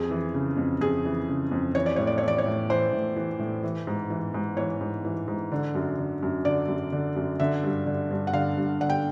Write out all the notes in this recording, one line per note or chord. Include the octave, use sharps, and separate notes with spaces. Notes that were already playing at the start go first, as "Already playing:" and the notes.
Already playing: F2 G#4
E3
C#3
F2
F2 G#4
E3
C#3
F2
E3 C#5
D5
A2 C#5
D5
E3 C#5
D5
C#5
A2
E3 C5
A2
E3
A2
E3
G#2
E3
G#2
E3 C#5
G#2
E3
G#2
D3
F#2
D3
F#2
D3 D5
F#2
D3
F#2
D3 E5
G2
D3
G2
F#5
D3 F5
G2
D3 F#5
G5